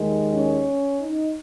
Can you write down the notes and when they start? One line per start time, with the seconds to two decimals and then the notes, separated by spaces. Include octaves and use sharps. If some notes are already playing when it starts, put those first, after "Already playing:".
Already playing: D#2 D#3 G#3
0.35 C#4
1.00 D#4